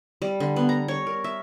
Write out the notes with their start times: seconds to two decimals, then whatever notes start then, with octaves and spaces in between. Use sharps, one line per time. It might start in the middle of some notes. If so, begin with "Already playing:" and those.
0.22 G3
0.40 D3
0.56 B3
0.69 A#5
0.88 C#5
1.07 A#4
1.24 E5